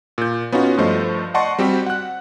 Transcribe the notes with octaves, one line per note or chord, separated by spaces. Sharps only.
A#2 G6
B3 C#4 D#4 F4 F#4
G2 F3 A3 C5 D#5
D5 D#5 F#5 A5 C6 C#6
G3 C4 F#4 G4
F#5 F#6